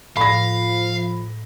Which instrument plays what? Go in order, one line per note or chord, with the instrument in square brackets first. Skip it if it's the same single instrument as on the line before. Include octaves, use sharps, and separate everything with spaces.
[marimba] A2 [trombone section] F3 [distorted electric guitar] F5 [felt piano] B5 A#6